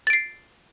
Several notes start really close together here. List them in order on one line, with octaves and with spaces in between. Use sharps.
A6 D7 C7